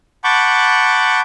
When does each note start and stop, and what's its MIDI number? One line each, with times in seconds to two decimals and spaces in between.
0.24 1.21 78
0.24 1.21 81
0.24 1.21 83
0.24 1.21 85
0.24 1.21 86
0.24 1.21 91